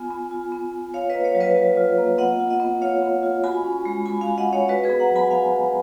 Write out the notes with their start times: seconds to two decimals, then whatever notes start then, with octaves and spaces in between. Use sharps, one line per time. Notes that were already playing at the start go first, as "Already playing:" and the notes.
Already playing: B3 F4 G#5 B5
0.10 B3
0.31 F4
0.52 B3
0.73 F4
0.94 F4 C#5 F5
1.10 B4 D#5
1.15 A#3
1.24 C#5 F5
1.35 F#3
1.40 B4 D#5
1.56 F#3
1.77 F4
1.98 A#3
2.18 B3 D#5 F#5
2.40 F4
2.50 D#5 F#5
2.60 B3
2.82 F4 C#5 F5
3.02 B3
3.23 F4
3.44 F#4 G#5 B5
3.64 C#4
3.85 G#3
4.06 G#3 G#5 B5
4.21 F5 G#5
4.27 F#4
4.38 D#5 F#5
4.48 C#4 C#5 F5
4.68 F#4 B4 D#5
4.84 G#4 B4
4.89 B3
5.00 F#5 A#5
5.10 F#3
5.15 G#5 B5
5.31 F#3 F5 G#5
5.52 F#4